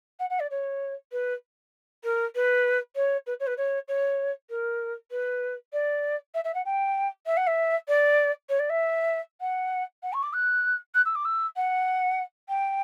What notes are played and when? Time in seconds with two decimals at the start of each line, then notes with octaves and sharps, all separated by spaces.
0.19 F#5
0.30 F#5
0.40 D5
0.50 C#5
1.12 B4
2.04 A#4
2.35 B4
2.95 C#5
3.26 B4
3.40 C#5
3.47 B4
3.57 C#5
3.88 C#5
4.50 A#4
5.11 B4
5.73 D5
6.34 E5
6.44 E5
6.54 F#5
6.65 G5
7.26 E5
7.37 F#5
7.47 E5
7.88 D5
8.49 C#5
8.59 D5
8.69 E5
9.41 F#5
10.03 F#5
10.13 C#6
10.23 D6
10.33 F#6
10.94 F#6
11.05 E6
11.15 D6
11.25 E6
11.56 F#5
12.48 G5